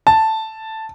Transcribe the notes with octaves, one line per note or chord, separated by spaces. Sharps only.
A5